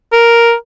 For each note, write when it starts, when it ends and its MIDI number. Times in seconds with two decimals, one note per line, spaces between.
0.13 0.53 70